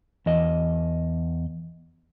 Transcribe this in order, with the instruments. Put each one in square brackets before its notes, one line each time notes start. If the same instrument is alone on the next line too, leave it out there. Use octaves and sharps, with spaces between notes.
[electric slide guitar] E2 D#5